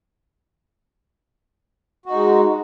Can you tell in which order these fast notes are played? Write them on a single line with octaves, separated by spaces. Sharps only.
F#4 D#4 G#3